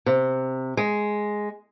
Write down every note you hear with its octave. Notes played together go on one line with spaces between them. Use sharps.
C3
G#3